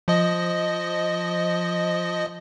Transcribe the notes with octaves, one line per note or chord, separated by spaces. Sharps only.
F3 D#5